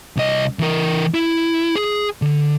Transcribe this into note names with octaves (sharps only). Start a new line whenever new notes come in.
C2 D#5
E3 A#4
E4
G#4
D3